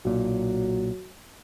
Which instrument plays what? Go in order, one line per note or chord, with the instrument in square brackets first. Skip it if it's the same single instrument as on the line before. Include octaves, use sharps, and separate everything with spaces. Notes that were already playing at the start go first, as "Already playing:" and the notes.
[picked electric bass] B1 A#2 [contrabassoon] F#3